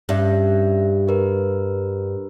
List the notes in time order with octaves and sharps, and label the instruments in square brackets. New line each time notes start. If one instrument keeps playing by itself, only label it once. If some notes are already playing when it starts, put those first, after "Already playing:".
[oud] G2 [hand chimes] C#4 E5
[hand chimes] G4 A#4 B4